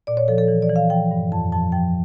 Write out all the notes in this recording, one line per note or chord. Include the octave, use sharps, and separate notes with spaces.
A#2 D5
C#5
F3 A4
A4
E3
D5
E3
F5
F3 G5
G2
F2 A5
F3 A5
F3 G5